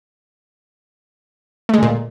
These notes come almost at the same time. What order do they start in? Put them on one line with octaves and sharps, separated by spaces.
A3 G#3 D3 A#2